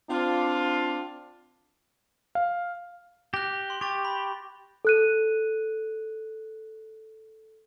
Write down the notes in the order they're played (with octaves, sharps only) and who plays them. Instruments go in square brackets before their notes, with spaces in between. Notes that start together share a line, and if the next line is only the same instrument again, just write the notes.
[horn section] C4 D4 F4
[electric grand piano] F5
[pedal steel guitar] G4 [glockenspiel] F#6 A#6
[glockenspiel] C6
[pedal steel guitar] G4 [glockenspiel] C#6 A6
[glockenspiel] B5
[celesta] A4 F#6 D#7